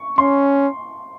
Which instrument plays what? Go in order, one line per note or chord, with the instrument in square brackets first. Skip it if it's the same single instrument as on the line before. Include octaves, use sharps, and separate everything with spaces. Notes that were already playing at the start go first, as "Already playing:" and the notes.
Already playing: [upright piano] C#6
[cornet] C#4 [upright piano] C6